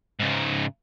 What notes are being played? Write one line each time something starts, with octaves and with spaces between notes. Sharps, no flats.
G#2 C#3